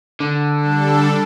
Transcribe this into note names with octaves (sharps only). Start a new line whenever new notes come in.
D3
G3 D4 A4